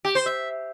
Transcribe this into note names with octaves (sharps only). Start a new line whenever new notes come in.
G4
C5
E5